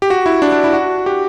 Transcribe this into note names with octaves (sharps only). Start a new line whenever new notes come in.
G4
F#4
E4
D4
D4
E4
F#4
G4